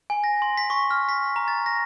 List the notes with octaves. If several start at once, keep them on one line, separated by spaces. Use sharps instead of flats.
G#5
A#6
C6
B6
C#6
F6
B6
A#5
A6
A#6